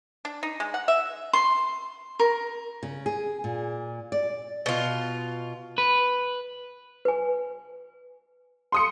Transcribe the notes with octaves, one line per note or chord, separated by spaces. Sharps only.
D4
D#4
G#3
F#5
E5
C6
A#4
C#3
G#4
A#2
D5
B2 F4
B4
B4 G#5
C6 D#6 C#7